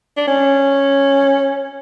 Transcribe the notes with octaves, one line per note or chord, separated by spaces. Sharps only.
D4
C#4